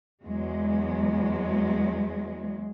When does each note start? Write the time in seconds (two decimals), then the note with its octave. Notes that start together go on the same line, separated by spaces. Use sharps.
0.24 E2 F#3 G#3